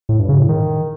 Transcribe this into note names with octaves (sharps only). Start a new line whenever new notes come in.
A2
G2
C#3
A2
D#3